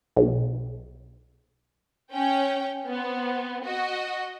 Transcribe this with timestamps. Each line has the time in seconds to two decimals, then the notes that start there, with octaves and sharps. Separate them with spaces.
0.16 B1
2.13 C#4 G5
2.87 B3 C4
3.65 F#4 D#5